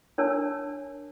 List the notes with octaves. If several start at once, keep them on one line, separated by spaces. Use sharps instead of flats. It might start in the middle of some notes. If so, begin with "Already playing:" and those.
D4 A#4 C#5 G#5 A5 E6